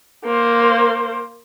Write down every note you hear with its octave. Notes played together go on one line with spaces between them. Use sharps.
A#3 C5